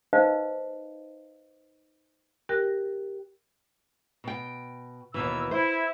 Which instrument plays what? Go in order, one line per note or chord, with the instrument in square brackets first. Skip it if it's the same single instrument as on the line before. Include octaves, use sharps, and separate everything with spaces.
[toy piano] D#4 B4 C5 D#5 F5
[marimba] G4 A#4 G5 F#6 A#6
[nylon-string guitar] B2 G5
[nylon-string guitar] D#2 B2 E3 [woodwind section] E6
[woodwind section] E4 [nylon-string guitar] C5